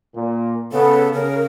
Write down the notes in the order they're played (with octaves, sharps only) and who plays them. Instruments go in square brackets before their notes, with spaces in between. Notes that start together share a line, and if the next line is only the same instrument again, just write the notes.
[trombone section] A#2
[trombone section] C#3 B3 [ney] A4
[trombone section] C#3 [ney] A#4